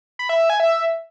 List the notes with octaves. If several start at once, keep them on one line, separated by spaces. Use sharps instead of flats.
B5
E5
E5
G#5
E5